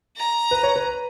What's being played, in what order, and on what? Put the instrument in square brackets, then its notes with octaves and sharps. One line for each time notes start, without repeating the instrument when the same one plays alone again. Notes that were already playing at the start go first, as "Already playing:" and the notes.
[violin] A#5
[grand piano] B4
C#5
B4